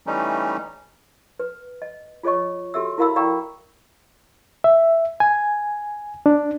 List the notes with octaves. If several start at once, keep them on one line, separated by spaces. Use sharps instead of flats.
E3 G3 A3 C#4 D#4
B4
D#5
F4 G#4 C#5 D#5 C#6
F#4 G4 A4 E5 E6
E4 A#4 F5 B5 E6
D5 F5 G5 A#5 C#6 E6
E5
G#5
D4